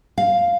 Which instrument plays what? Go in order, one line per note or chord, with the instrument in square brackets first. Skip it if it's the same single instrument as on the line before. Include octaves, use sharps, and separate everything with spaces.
[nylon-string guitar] F5